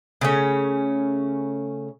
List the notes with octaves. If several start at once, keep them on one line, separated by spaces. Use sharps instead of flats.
C#3 A3 C#4